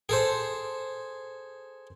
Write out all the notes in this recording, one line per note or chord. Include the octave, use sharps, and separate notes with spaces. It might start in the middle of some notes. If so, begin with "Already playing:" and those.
G#4 A4 C5